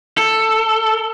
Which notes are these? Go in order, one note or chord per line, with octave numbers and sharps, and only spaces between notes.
A4